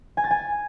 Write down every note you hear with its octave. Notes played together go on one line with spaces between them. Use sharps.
G#5
A6
G#5